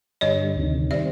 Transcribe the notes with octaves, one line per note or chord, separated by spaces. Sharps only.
G2 D3 G3 C#5 D#5
D2 C3 D#3
D#3 G3 C4 D5 E5